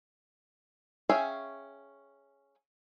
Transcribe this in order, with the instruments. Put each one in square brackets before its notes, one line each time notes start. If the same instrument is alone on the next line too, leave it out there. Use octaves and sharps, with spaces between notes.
[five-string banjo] C#4 G#4 E5 F5 G5